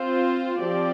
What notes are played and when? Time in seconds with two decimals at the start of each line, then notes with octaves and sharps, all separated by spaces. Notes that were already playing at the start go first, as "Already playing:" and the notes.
Already playing: C4 F4 C5
0.59 F3 C4 G4 D5